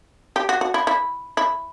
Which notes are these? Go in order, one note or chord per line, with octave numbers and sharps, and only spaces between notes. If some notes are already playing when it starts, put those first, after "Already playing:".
G4
F#4
F#4
E4
E4
E4